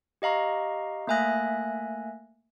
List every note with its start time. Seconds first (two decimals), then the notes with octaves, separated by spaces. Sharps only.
0.22 G4 D#5 F5 A#5 C#6
1.07 A3 A#3 E5 G#5 F#6 A#6